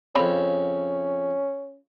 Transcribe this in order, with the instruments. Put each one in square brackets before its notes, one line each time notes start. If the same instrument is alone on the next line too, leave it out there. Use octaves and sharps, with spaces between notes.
[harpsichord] F2 C#3 [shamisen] C4 C#5 B5 [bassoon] C#4